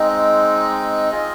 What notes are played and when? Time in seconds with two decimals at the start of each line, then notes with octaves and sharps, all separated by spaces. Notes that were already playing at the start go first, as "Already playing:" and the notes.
Already playing: G#3 C4 D#4
1.11 F4 G#4 D#5